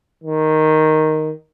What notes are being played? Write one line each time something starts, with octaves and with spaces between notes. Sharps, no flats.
D#3